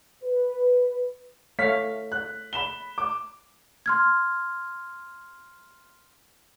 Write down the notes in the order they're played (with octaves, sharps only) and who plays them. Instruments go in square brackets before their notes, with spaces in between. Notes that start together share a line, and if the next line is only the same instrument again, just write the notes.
[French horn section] B4
[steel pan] A3 C#5 F5 [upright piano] B6
[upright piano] F#6
B5 E7 G7
D6
[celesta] C6 F6 G#6